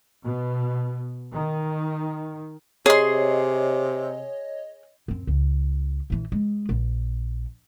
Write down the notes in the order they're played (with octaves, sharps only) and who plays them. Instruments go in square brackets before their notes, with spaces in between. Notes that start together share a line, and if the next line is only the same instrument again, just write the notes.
[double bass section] B2
D#3
[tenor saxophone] C3 [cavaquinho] G#4 C6 [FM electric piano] C#5 D#5
[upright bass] F#2 C4
C#2
A#1 E3
G#3
A#1